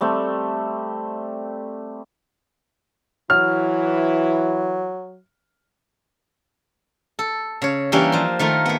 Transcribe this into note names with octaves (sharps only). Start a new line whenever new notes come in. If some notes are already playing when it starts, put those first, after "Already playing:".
G3 A3 C4
E3 F#3 E4 F6
A4
C#3 C#5
E3 G3 A#3 C#4 D4 G4
F3 C6
D#3 A3 F4 A#4
A#3 B3